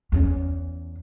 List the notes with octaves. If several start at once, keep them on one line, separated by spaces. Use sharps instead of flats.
E2 C#4